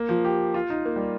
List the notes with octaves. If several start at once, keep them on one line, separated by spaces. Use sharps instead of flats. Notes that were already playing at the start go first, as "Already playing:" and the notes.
Already playing: A#3
F3
G4
F4
D#4
A#3
G3